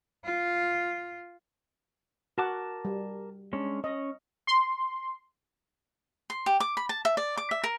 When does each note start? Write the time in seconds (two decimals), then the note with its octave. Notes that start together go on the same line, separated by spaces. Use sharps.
0.24 F4
2.38 F#4 A#4 F#5 A5 D6
2.85 G3
3.53 G#3 C#4 D4
3.84 C#4 D#5
4.47 C6
6.30 C6
6.46 G4
6.60 D6
6.77 B5
6.89 A5
7.05 E5
7.17 D5
7.37 D6
7.51 E5
7.64 A#4